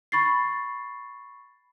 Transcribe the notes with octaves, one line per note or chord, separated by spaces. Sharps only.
B5 C#6 A6 C7